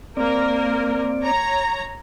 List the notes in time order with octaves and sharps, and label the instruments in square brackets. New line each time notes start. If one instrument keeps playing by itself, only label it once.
[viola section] A#3 A#4 [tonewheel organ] C4 D5
[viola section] C#5 A#5